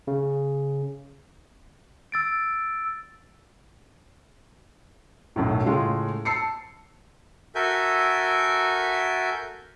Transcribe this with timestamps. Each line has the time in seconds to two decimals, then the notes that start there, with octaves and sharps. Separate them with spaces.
0.07 C#3
2.12 E6 A6 D7
5.36 B1 F#2 A2
5.66 A2 C#3 G#3 F4
6.25 A5 E6 C7 C#7
7.55 F#4 A4 A#4 E5 G#5 G6